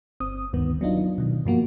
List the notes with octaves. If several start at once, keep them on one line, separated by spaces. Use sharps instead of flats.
G1 C4 D#6
D2 G2 D#3 B3
F#3 B3 D4 D#4 F4
B2 D#3
G2 F3 A#3 F#4